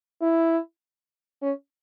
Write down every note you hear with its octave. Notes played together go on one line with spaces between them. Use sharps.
E4
C#4